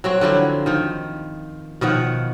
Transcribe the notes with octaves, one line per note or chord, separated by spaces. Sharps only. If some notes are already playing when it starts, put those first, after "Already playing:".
F#3 C4 F#4
D3 F3 F#3 E4
D#3 F3
B2 D#3 F3 F#5